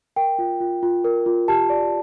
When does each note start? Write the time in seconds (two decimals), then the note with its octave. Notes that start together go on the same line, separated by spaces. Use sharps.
0.16 A#4 G5
0.39 F4
0.60 F4
0.83 F4
1.04 A#4
1.26 F4
1.48 G4 A5
1.70 D5